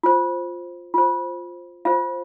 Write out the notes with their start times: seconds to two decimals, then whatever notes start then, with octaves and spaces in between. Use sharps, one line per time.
0.03 F4 C5
0.94 F4 C5
1.85 F4 C5 F5